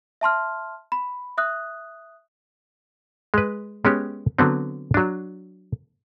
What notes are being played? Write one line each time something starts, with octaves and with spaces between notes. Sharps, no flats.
E5 A5 C6 F6
B5
E5 D#6 F#6
G#3 B4
G#3 B3 C#4 G4
D3 F#3 B3 C4
F#3 D4